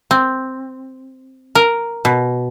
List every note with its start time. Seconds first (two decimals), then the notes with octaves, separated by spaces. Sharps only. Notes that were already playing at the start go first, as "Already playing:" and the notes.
0.11 C4
1.55 A#4
2.05 B2